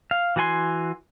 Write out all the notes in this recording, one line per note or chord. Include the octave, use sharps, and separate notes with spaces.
F5
E3 F#4 F#5 G#5 C6